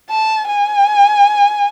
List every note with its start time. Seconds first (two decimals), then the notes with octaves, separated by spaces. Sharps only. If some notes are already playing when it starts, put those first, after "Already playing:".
0.10 A5
0.48 G#5